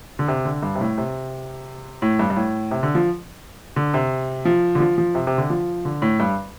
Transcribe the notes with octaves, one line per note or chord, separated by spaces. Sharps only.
D3
C3
D3
G2
C3
A2
C3
A2
G2
G2
A2
C3
D3
F3
D3
C3
F3
D3
F3
F3
C3
C3
D3
F3
D3
A2
G2